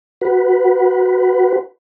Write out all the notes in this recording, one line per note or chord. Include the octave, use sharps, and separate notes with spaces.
F#4 B4